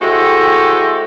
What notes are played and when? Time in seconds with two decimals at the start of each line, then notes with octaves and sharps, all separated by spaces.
0.01 G#3 C4 E4 F#4 G4 A4